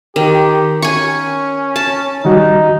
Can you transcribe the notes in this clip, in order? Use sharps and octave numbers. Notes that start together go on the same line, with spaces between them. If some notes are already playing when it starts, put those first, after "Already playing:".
D#3 G4
C#4 G#5 C#6
A5
D#3 G3 D#4 F#4